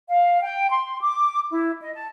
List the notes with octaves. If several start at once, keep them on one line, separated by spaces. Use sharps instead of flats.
F5
G5
C6
D6
E4
D#5
A5